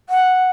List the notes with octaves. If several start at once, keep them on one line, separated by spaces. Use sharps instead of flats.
F#5